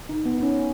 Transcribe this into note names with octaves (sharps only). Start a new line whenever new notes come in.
D#4
B3
D#4
C#4